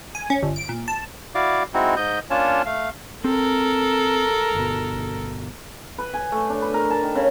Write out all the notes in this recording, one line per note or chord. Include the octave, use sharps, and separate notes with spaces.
G#5
C#4
G1
D7
A#2
A5
E4 F#4 D5 F5 D6
G#3 C4 D#4 E4 F#4
G#2 D#5 G6
A#3 C#4 D4 F4 C#5 A5
A3 F5
C4 A4 A#4
G1 B2
B4
G#5
A3
D4
B4
A#4
A5
D#3
C#3